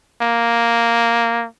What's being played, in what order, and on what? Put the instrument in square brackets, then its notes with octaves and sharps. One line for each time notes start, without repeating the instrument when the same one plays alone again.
[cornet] A#3